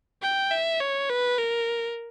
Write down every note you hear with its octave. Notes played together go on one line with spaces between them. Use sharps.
G5
E5
C#5
B4
A#4